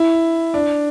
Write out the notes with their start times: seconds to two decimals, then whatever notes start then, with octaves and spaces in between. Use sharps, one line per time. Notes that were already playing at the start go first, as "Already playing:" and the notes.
Already playing: E4
0.54 D4